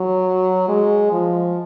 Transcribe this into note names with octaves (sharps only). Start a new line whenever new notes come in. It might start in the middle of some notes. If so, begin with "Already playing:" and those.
Already playing: F#3
G#3
F3